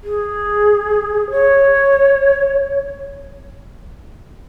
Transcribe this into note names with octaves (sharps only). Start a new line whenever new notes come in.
G#4
C#5